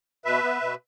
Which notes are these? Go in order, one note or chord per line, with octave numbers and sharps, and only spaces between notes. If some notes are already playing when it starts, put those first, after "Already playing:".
B2 B4 E5
B3
B2